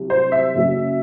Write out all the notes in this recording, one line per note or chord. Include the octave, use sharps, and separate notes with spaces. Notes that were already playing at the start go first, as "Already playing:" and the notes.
Already playing: C2 C3 F#3
C5
E5
F#1 F#2 F#3